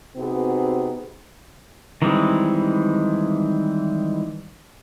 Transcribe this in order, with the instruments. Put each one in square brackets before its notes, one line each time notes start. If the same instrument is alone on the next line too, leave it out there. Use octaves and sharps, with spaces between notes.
[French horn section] C3 B3 C4 D#4 F#4 G#4
[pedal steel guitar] D#3 E3 G3 G#3 C4